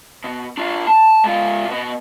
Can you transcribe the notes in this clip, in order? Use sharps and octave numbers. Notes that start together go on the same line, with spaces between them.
B2
D4 F4
A5
G#2 F4
B2 B3